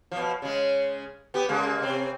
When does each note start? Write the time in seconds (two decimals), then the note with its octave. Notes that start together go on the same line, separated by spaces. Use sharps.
0.12 B2 F3
0.42 C#3 G#3
1.34 B3 G4
1.49 C#3 G#3 A#3
1.82 C3 C4